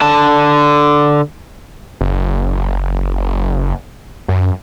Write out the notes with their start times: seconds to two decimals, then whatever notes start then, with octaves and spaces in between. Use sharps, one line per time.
0.02 D3 A5
2.01 F#1
4.28 F#2